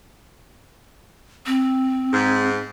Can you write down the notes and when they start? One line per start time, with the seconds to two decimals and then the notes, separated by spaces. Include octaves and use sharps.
1.46 C4
2.13 G#2